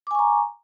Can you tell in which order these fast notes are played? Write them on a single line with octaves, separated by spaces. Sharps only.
D6 G#5 C#6 A#5